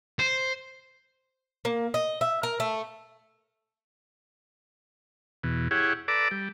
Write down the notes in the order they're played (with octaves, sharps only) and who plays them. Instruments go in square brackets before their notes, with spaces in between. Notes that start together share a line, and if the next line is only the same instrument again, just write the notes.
[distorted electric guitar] C5
[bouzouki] A#3
D#5
E5
A#4
A3
[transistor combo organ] E2 B2
E4 G4 G#4 C#5 F#5
A4 B4 D5 A#5 D6 E6
G3